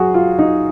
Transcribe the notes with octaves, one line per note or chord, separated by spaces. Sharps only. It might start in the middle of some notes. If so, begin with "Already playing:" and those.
Already playing: F#2 F#4 G#4
F4
D#4